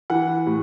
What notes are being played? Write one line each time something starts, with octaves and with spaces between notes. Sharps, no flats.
E3 F#5
A2